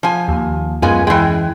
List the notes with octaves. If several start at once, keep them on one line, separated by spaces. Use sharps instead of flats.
F3 G#5
D#2
F#2 G#3 B3 F4 G#5
E3 G#3 E4 G5